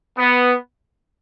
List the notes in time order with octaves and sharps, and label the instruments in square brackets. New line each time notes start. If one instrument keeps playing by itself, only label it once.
[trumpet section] B3